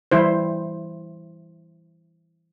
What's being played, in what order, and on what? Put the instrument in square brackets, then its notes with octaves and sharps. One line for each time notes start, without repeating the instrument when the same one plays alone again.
[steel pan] E3 G3 E4 C5